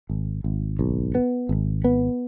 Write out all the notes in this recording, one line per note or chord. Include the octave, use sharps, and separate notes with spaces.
G#1
G#1
B1
B3
G#1
B3